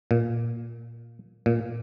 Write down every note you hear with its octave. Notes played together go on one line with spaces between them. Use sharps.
A#2
A#2